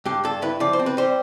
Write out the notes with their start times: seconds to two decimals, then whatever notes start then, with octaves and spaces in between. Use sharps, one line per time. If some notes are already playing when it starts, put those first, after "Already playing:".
0.05 G2 G4
0.24 G2 A4
0.42 E4 B4
0.60 F3 D5
0.73 C5
0.79 C4
0.86 B4
0.97 G3 C5